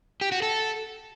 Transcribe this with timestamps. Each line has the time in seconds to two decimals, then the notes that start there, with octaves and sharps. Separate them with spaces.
0.21 G4
0.32 F#4
0.42 A4